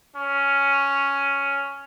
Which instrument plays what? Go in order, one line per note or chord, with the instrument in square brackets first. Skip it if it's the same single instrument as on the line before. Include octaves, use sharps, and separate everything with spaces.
[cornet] C#4